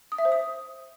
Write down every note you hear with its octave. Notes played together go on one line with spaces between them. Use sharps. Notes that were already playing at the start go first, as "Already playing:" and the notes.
D#6
E5
C5
D#6